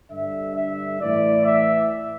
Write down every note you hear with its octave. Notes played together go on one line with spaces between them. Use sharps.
G2 D3 E5
E5
A2 E3 D5
E5